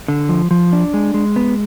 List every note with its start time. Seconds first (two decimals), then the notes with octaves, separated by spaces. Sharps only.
0.08 D3
0.29 F3
0.51 F3
0.73 D4
0.94 G#3
1.14 G#3
1.36 B3